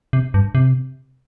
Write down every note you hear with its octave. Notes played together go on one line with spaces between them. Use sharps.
C3
G2
C3